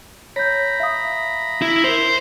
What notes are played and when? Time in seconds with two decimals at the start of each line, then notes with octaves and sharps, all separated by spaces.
0.36 C#5 A#5 B5 G6
0.80 E5 F5 D#6
1.62 E4
1.84 A#4 C5 F7